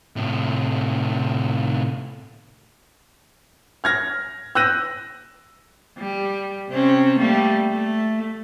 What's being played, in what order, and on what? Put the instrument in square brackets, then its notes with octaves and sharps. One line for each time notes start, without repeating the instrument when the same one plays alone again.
[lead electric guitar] A2 C3
[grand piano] F6 G#6 A#6
E6 F#6 G6 A#6 D#7
[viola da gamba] G3
C3 C4 C#4
G3 A3 A#3
A3